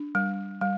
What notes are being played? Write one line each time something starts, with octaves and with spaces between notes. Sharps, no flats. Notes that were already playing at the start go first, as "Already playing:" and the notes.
Already playing: D4
G3
G3